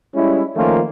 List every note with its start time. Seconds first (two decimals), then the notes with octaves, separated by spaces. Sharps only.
0.15 G3 G#3 C#4 E4
0.56 D#3 F3 A3 A#3 C#4 F4